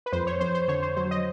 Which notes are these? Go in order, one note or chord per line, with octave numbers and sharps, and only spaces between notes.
B4
F2 C5
C#5
F2 C5
C5
D3 C#5
C5
F#3 C5
D#5